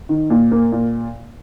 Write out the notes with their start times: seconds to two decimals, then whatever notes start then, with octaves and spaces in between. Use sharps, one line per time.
0.09 D#3
0.30 A#2
0.52 A#3
0.72 A#2